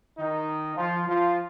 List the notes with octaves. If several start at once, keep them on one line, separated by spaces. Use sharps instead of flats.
D#3 D#4
F3 F4
F3 F4